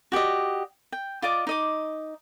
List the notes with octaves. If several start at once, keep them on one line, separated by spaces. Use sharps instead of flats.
F#4 G4 D5 D#5
G5
F4 D5 D#5 D6
D#4 D#5 D6